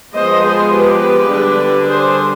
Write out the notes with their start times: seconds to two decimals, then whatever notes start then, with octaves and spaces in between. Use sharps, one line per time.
0.15 F3 G#3 B3 C5 D#5
0.44 G#4 C5
0.73 G4 B4
1.30 D3 G3 D4
1.87 G#4 C5